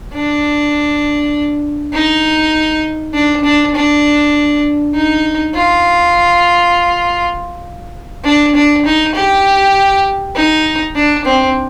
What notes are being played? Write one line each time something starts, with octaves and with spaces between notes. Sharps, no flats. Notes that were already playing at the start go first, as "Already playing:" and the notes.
D4
D#4
D4
D4
D4
D#4
F4
D4
D4
D#4
G4
D#4
D4
C4